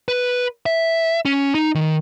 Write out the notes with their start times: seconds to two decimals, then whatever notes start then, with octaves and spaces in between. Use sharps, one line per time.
0.08 B4
0.66 E5
1.25 C#4
1.55 D#4
1.75 D#3